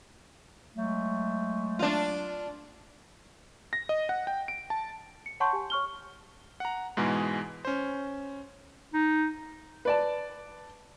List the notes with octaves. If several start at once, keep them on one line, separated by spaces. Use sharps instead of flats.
F#3 G#3 A3
D4 F4
A#6
D#5
F#5
G5
D7
A5
C#7
C#5 F#5 A5 C6 C#6 G6
G4 G#5
C#5 C#6 F6 G7
F#5 A#5
G#2 B2 E3 G#3 G#4
C#4 C5
D#4
B4 D5 A5